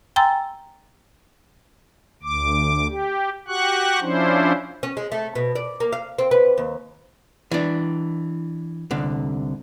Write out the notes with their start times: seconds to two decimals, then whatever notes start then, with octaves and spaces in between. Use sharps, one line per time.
0.16 G5 G#5 A#5 C6 E6 A6
2.23 D2 D6
2.89 G4
3.48 F#4 G4 F#5 C#6 F#6
4.01 F3 C#4 D4 E4 C5
4.83 C#4
4.97 G#3
5.12 A3
5.35 B2
5.55 D5
5.80 A#3
5.92 F5
6.18 C4
6.31 B4
6.58 D#2
7.51 E3 D4
8.91 C2 D3